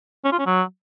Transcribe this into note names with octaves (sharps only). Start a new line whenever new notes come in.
C#4
F4
C#4
F#3